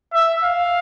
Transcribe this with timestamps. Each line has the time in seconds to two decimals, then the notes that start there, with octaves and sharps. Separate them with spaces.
0.14 E5
0.43 F5